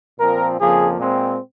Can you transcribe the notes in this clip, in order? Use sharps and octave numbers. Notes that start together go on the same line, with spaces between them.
A#2 F3 C4 A#4
F2 C#3 F3 A#3 G#4
A#2 G#3 C4